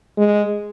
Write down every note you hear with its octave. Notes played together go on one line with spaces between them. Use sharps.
G#3